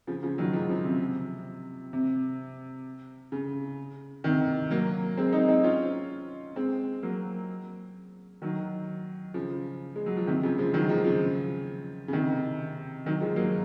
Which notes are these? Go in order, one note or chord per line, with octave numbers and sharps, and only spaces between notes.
C#3 F3
C#3 F3
D#3 F#3
F3 G#3
C#3 F3
C3
C3
C#3
C3 D#3
F#3 A#3
G#3 C4
C4 D#4
C4 D#4
C#4 F4
G#3 C4
F#3 A#3
D#3 F#3
C#3 F3
G#3
F#3
F3
C3 D#3
C#3 F3
F3 G#3
D#3 F#3
F3 G#3
C#3 F3
C#3
C3 D#3
D#3 F#3
F3 G#3
F#3 A#3